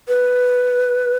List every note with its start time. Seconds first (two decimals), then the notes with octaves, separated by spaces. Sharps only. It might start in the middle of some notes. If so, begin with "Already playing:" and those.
0.08 B4